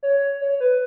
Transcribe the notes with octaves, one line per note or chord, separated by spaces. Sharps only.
C#5
C#5
B4